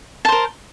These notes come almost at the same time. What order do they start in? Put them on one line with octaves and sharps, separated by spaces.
A5 C5 A#4